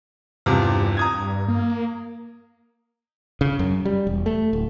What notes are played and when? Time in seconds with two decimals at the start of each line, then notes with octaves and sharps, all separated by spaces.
0.46 E2 G2 C3 F3
0.97 A#5 D#6 G#6
1.48 A#3
3.41 C#3
3.59 F#2
3.85 G3
4.07 E1
4.26 A3
4.53 D1